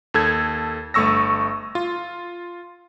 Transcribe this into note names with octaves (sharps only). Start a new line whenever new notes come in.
D#2 A4 G#6
G1 A3 C#6 E6 A#6
F4